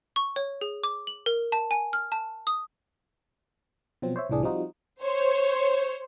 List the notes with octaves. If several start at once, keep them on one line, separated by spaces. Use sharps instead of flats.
C#6
C#5
G#4
D6
F#7
A#4
A5
G#5
F6
A5
D#6
B2 F3 F#3 C4
C5 C#5 E5
C2 A2 E3 D4 G#4
F3 G3 C4 D#4 F4 F#4
C5 C#5